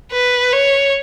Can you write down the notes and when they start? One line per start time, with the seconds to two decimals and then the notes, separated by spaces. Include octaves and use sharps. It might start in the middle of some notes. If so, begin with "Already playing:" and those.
0.12 B4
0.53 C#5